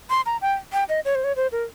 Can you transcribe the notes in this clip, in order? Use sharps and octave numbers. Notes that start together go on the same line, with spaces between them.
C6
A#5
G5
G5
D#5
C#5
C5
C#5
C5
A#4